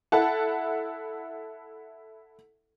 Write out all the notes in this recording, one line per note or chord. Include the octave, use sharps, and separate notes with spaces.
E4 A4 F#5 A5